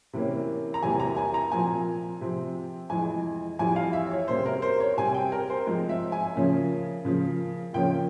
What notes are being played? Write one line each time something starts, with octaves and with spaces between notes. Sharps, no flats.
C3 E3 A#3 C#4
A#5
E2 C3 G3 A#3 G#5
A#5
G#5
A#5
A#2 F3 C4 G#5
C3 F3 C4
F2 E3 G#3 G#5
F2 E3 G3 G#5
F5
E5
C#5
C3 G3 A#3 C#4 C5
A#4
C5
C#5
C3 G3 C4 G#5
G5
A#4
C5
G#2 F3 G#3 C4
E5
G#5
C#3 F3 A#3 C#4
C#3 F3 A#3
F2 C#3 F3 A#3 C#4 G5